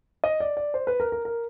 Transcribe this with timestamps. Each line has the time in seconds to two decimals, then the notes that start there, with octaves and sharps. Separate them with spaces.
0.24 D#5
0.40 D5
0.57 D5
0.74 C5
0.87 B4
1.00 A#4
1.12 A#4
1.25 A#4